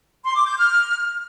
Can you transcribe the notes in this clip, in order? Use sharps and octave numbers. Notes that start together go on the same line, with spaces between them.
C6
D6
G6
F6